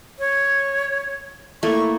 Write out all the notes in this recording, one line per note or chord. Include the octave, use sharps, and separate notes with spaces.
C#5
A3 A#3 E4 C#6